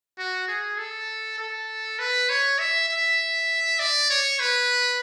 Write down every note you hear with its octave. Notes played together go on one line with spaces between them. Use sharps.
F#4
G#4
A4
A4
B4
C#5
E5
E5
D5
C#5
B4